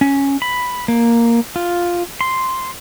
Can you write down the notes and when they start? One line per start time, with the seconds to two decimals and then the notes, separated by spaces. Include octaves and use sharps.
0.01 C#4
0.42 B5
0.88 A#3
1.56 F4
2.21 C6